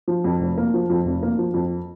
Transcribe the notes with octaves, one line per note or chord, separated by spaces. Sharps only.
F3
F2
F1
A#3
F3
F2
F1
A#3
F3
F2